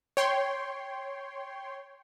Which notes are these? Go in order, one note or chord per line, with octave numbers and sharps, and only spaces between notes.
C#5 G5 C6